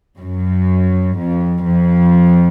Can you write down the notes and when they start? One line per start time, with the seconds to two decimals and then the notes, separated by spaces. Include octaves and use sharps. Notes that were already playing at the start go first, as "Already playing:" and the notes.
0.18 F#2
1.17 F2
1.66 F2